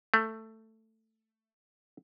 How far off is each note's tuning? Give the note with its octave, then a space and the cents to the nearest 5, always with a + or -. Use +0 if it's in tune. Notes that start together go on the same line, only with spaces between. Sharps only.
A3 +10